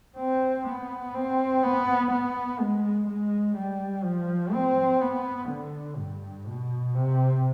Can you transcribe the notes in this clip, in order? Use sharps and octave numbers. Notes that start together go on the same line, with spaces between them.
C4
B3
C4
B3
B3
G#3
G#3
G3
F3
C4
B3
D3
G2
B2
C3